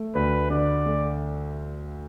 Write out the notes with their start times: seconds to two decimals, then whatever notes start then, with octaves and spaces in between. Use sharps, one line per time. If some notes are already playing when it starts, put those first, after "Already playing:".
Already playing: A3
0.15 D2 B4
0.50 D3 D5
0.86 A3